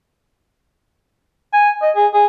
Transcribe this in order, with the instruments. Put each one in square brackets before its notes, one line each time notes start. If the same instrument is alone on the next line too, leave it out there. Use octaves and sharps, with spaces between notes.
[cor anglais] G#5
D#5
G#4
G#4